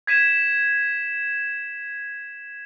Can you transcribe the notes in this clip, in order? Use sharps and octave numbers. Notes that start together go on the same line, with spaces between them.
G#6 B6 D#7 E7